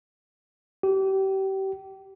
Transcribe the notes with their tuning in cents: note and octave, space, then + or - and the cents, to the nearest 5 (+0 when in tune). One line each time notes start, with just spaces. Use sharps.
G4 -30